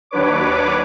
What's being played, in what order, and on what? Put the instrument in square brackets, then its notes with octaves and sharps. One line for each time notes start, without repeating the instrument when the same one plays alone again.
[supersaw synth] D#2 F#3 D4 B4 C#5 D6